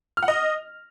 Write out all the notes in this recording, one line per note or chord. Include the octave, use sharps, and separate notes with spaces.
F6
F#5
D#5